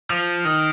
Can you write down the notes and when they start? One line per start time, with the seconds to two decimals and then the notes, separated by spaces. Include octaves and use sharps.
0.10 F3
0.45 D#3